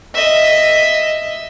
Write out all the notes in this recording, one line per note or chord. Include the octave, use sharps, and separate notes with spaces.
D#5 E5